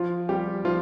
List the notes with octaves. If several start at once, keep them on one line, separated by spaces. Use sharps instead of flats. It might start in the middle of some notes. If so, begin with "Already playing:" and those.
Already playing: F3 F4
G3 G4
F3 F4